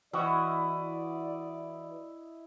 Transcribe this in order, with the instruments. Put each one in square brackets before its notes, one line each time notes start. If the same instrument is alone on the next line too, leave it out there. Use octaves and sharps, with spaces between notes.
[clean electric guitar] E3 F#4 [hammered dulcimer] E4 D#5 [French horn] D5